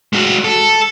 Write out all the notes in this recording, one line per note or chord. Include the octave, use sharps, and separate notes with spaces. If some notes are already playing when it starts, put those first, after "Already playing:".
G#3 F#4
A4